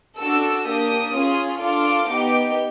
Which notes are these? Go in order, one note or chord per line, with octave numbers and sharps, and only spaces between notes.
D4 F#4 A4 E6
A#3 D4 G4 D#6
C#4 F4 G#4
D4 F4 A4 D6
B3 D#4 G4